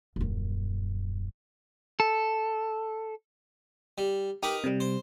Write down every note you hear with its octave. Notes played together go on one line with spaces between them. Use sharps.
D#1 F#2
A4
G3
D#4 G4 A#4 B4
C3 G3
C5